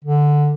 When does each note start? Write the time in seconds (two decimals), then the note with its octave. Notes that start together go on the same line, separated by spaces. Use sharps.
0.05 D3